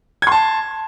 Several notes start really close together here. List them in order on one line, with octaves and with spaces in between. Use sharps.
G#6 C6 A5